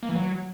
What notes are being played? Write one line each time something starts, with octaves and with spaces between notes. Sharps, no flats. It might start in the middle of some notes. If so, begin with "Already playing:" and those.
A#3
E3
F#3